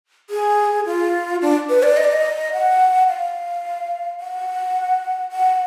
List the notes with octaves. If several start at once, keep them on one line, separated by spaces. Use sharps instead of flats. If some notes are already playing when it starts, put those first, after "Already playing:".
G#4
F4
D4
B4
D5
D#5
D5
D#5
F#5
F5
F#5
F#5